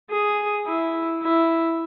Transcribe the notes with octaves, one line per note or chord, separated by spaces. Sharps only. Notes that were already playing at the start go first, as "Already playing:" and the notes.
G#4
E4
E4